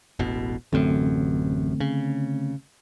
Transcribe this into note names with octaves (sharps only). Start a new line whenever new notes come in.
E1 A1 B2
A1 F#2 D3 A3 C4
C#3